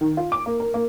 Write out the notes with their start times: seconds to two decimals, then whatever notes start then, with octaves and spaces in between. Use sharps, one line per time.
0.01 D#3
0.17 F4
0.32 D6
0.46 A#3
0.60 A#4
0.74 A#3